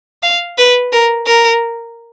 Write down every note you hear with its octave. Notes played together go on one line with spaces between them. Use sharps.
F5
B4
A#4
A#4